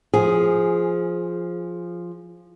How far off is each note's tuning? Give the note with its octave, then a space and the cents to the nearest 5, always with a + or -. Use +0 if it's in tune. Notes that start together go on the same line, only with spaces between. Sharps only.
F3 +0 G#4 +0